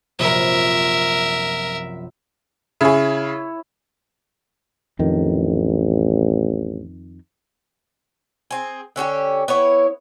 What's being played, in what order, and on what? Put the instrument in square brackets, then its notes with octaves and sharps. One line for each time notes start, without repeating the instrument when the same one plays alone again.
[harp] A#1 F#2 C3 [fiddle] A#4 E5
[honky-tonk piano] C#3 G#4 [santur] E4 C#5
[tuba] A1 [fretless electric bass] F2 D#3
[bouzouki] C4 G#4
D3 C#4 F#4 G4
B3 E4 C#5